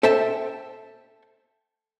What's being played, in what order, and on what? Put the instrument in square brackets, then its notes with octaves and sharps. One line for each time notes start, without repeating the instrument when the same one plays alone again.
[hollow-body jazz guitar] A4 C5 E5 G5 A5